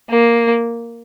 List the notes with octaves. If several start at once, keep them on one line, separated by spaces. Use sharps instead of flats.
A#3